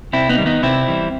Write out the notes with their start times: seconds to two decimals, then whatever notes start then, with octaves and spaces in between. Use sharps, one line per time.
0.13 C3 C4 E4
0.29 B3 D#4
0.38 D#3 G3
0.46 B3 D#4
0.63 C3 C4 E4
0.88 E3 G3